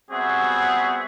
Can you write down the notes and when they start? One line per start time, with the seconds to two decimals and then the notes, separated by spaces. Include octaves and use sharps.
0.11 G3 B3 C4 F#4 G#4 E5